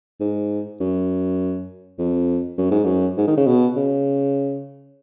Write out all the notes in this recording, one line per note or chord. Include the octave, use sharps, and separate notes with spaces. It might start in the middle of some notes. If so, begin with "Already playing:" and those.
G#2
F#2
F2
F#2
G#2
F#2
G#2
D#3
C#3
B2
C#3